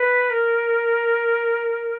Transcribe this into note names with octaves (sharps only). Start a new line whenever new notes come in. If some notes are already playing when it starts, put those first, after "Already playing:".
Already playing: B4
A#4